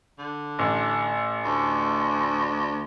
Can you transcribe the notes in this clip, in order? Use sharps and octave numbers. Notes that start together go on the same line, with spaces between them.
D3
A1
D2